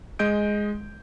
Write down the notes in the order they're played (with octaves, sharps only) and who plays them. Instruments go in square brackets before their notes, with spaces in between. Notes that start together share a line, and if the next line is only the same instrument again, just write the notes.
[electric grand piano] G#3 D#5 G6 D7